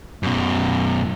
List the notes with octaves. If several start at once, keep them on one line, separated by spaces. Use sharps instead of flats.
F#2 B2